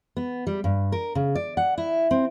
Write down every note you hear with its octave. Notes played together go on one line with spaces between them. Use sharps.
B3
G3
G2
A#4
C#3
D5
F#5
E4
C4